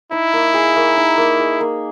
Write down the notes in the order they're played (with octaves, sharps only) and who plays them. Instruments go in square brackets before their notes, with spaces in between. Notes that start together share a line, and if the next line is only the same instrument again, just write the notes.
[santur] D#4 [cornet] E4
[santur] A#3
G#4
A#3
D#4
A#3
G#4
A#3